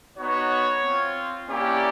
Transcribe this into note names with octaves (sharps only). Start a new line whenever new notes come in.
B3 D#4 F#4 C#5
C4 F4
A#3 C#4 E4 G4 D5